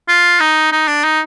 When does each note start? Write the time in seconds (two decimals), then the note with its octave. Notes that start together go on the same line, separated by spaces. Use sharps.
0.08 F4
0.40 D#4
0.72 D#4
0.88 D4
1.04 D#4